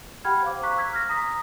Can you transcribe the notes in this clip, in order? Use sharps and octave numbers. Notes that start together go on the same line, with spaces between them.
G4 F#5 G5 B5 F6 G#6
C5 F5 D6
A#5 C#6 F#6 B6
E6 G#6 B6
F6 A#6
A#5 D#6 A#6 B6